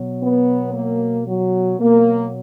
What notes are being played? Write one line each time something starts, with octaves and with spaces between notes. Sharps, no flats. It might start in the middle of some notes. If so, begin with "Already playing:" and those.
Already playing: B2 F#3
B3
A#3
F#3
B2 F#3 A#3